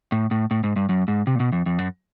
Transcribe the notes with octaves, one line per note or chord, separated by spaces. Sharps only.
A2
A2
A2
G#2
G2
F#2
G#2
C3
A#2
B2
F2
F2
F#2